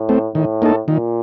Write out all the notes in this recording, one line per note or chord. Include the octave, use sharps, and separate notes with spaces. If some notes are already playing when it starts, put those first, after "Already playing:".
Already playing: A2
A3 C4
A2 D#3
A#3 D#4 A4
A#2 D#3